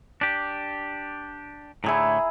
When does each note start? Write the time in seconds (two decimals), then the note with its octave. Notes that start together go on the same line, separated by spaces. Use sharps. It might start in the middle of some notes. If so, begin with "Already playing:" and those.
0.21 D4 G4
1.84 A2 D3 A3 E4 G#4 A#5